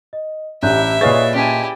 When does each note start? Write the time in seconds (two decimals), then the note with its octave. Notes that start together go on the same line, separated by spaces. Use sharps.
0.13 D#5
0.63 A1 D4 E4 G4 E5 A#5 F#6 G6
1.01 A#2 G#4 B4 C#5 D#5 F5 C#6 A6
1.35 C#4 E4 G4 G#5 A5 B6